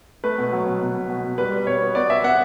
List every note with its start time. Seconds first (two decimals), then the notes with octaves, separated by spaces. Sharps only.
0.24 A3 B4
0.38 B2
0.52 F#3
0.67 B2
0.81 B2
0.96 B2
1.09 B2
1.24 B2
1.38 G3 B4
1.52 G3
1.67 B2 C#5
1.81 B3
1.95 B3 D5
2.10 B3 E5
2.24 B3 F#5